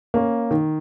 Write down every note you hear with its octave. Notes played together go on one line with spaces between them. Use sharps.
A#3 C#4
D#3